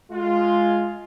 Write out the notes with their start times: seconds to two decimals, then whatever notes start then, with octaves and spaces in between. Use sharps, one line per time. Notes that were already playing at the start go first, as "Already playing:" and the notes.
0.11 G#3 F4